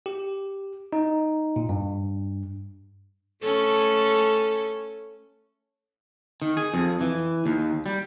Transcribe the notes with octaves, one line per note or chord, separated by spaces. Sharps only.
G4
D#4
A#2
G2
A3 C#4 A4
D#3
G#4
F2
E3
D#2
G3